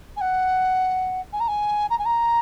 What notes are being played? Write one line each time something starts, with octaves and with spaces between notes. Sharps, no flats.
G#5
F#5
G#5
A#5
G#5
A#5
G#5
A#5